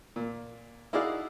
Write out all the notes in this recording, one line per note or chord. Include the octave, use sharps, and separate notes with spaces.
A#2
D#4 E4 F#4 G#4 D5 F5